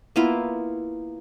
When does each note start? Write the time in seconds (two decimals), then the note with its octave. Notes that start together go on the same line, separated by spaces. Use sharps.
0.16 A#3 B3 E4 F4